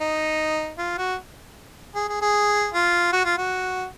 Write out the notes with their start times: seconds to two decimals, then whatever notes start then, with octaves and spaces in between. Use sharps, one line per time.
0.01 D#4
0.78 F4
0.98 F#4
1.95 G#4
2.09 G#4
2.22 G#4
2.74 F4
3.12 F#4
3.25 F4
3.37 F#4